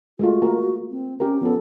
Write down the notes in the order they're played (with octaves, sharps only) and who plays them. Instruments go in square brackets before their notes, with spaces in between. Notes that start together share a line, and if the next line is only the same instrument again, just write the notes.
[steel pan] G#3 A3 F4 [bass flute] F#4
[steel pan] A#3 G#4 A#4
[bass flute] C4
[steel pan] C4 G4 A#4 [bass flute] C#4
[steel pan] F3 C#4 A4 [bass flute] B3